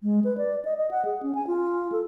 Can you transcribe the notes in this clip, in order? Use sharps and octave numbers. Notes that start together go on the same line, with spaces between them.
G#3
B4
D5
D#5
D#5
F#5
G#4
C#4
G#5
F4
A4